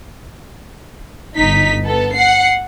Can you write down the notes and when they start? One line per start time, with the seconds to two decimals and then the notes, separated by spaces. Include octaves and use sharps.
1.36 G1 D#4 B6
1.85 B3 A4
2.14 F#5 C7